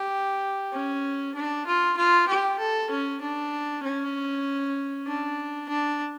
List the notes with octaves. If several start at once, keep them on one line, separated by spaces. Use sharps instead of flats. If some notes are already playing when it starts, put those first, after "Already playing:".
Already playing: G4
C#4
D4
F4
F4
G4
A4
C#4
D4
C#4
D4
D4